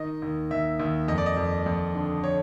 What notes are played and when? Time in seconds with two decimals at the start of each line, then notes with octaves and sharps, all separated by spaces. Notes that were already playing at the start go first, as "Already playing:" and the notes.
Already playing: D#3 D#5
0.22 D#2
0.51 D#2 E5
0.80 D#2
1.08 F2 D#5
1.18 D5
1.26 D#5
1.37 F2
1.66 F2
1.95 D3
2.24 C#5